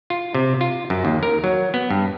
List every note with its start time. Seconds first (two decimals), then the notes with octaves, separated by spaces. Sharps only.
0.10 F4
0.35 C3
0.61 F4
0.90 F#2
1.05 D#2
1.23 A#4
1.44 F#3
1.74 B3
1.90 G2